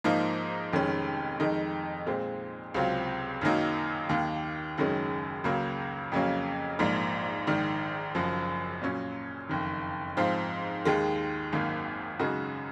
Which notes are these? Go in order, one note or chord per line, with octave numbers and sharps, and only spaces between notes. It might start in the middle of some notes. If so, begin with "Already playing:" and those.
G#2 F3 A#3 D#4
F1 F2 D#3 G#3 C#4
F2 D#3 G#3 D#4
A#2 G#3 C4
C#2 C3 F#3 C4 F4
F#2 D#3 F#3 A#3 D#4
D#2 D#3 A#3
F#1 F#2 D#3 G#3 C#4
C#2 C#3 F#3 A#3
F2 C#3 F#3 A#3 C#4
A#1 G#2 F3 A#3
A#1 G#2 D#3
F#1 F#2 F3
A#2 F#3 C#4
F#1 F2 D#3
G#2 F3 C4 F4
D#2 D#3 G#3
G#1 F#2 D#3 A#3
F#2 C#3 G#3 D#4 F#4